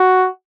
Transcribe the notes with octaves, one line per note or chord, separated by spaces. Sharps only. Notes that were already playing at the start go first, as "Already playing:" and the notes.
Already playing: F#4